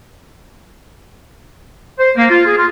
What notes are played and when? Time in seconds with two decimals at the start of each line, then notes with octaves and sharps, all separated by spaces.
1.99 C5
2.17 A#3
2.30 F4
2.46 G#4
2.58 F4